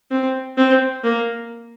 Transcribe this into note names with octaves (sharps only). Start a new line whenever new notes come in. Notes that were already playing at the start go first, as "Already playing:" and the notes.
C4
C4
A#3